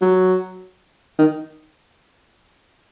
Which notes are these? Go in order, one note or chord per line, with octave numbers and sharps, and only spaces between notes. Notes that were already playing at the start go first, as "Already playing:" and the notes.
F#3
D#3